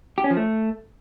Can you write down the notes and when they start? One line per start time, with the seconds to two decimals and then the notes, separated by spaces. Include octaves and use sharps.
0.18 G4
0.24 C#4
0.30 F3
0.37 A3